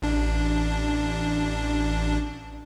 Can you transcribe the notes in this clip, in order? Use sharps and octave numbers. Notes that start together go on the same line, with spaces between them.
A1 D4